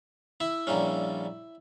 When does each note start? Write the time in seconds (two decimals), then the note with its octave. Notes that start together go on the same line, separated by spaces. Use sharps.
0.40 E4 E5
0.67 A#1 A#2 G3 C#4